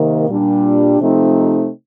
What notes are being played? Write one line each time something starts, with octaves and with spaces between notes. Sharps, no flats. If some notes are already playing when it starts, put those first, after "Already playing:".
Already playing: C3 D#3 A#3
A#2 G3 D4
C3 F3 A3 C4 D#4